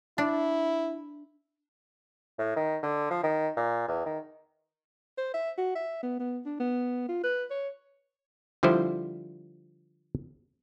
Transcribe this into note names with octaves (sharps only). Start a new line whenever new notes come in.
D4 E4
A2
D#3
D3
F3
D#3
A#2
E2
D#3
C5
E5
F#4
E5
B3
B3
D4
B3
F4
B4
C#5
D3 F3 G3 E4 C5